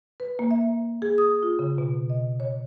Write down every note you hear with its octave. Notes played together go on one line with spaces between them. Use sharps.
B4
A#3
E5
G#4
D#6
F4
C#3
B2
D#5
C#5